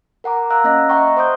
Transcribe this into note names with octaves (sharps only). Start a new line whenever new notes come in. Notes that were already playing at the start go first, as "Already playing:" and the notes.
A#4 F#5 A#5 D6
F5 A#5 D6 E6 F#6
A#3 C#4 D#5 F#6 A#6
D#5 E5 F#5 G5 A#5 C#6
C5 C6 D6 D#6 G6